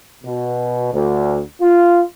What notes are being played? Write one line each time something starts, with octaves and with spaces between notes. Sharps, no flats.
B2
D2
F4